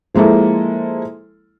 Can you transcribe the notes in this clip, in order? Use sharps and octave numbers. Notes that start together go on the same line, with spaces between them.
F3 G#3 A#3 E4 A4